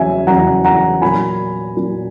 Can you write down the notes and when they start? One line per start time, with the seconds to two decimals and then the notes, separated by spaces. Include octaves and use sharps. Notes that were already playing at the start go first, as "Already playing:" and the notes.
Already playing: E2 C#3 F#3 E5 G#5
0.27 E2 C#3 F#3 F#5 A#5
0.64 F#5 A#5
1.02 A#2 F#3 G#5 B5
1.77 A#2 F#3